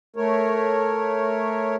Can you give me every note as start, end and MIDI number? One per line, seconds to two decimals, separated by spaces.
0.16 1.76 57
0.16 1.76 70
0.16 1.76 73